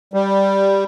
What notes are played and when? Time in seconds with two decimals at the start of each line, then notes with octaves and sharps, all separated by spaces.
0.14 G3